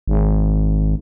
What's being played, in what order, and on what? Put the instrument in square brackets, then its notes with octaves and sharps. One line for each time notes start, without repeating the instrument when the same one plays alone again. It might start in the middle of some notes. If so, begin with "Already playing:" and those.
[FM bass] G#1